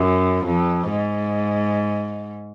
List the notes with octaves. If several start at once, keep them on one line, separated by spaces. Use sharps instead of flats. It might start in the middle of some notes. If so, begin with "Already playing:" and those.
Already playing: F#2
F2
G#2